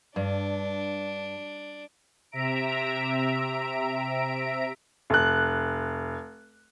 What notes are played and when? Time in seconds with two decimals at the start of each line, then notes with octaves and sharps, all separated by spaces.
0.16 G2 D4
2.31 C3 E5 A#5 D7
5.10 F1 F#6